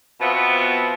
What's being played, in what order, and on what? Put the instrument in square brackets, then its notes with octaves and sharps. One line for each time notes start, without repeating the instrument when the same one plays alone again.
[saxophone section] B2 B3 C4 F4 E5 F#5